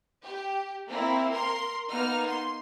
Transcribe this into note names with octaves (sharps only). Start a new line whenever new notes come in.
G4
A#3 C4 E4
A#4 C6
A#3 B3 D#4 F6
C6